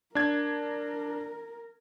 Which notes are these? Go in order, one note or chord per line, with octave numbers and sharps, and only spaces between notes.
D4 A#4 G#6